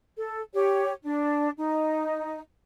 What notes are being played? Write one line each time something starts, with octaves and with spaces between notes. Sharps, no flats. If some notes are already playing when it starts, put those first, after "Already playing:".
A4
G4 C#5
D4
D#4